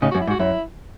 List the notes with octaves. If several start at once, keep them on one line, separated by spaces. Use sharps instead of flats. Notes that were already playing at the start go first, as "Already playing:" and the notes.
A2 C#3 D#4
F#4
F#2
E4
G#2
F#4
F#2 E4